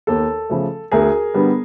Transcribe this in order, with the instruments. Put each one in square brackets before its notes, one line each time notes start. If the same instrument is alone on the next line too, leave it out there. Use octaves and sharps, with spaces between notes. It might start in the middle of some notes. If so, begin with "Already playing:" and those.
[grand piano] D#2 A4
C#3 F3 A3
D2 G#4 A#4
D3 G3 B3